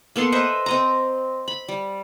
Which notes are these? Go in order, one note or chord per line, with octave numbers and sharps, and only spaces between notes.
A#3 B3 A4 C6
B4 C5 D#5 E5
C4 D#5 A#5
B5
G3